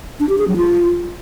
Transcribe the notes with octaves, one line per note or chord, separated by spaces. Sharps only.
D4
G4
G#4
F#3
F4